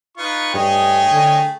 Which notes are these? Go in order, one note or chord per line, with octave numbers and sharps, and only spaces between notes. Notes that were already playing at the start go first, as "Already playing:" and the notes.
D#4 F4 B4 C#6
G2 A3 G#4 C#5 D#5 G5 G#5
D3